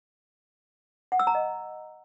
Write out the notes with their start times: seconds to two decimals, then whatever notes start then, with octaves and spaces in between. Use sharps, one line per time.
1.12 F#5
1.19 E6
1.27 A#5
1.35 D#5